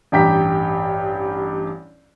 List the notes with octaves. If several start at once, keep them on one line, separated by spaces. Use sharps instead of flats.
A1 G2 G4 G5 A#5 B6